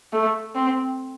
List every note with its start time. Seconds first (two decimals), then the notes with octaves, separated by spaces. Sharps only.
0.13 A3
0.55 C4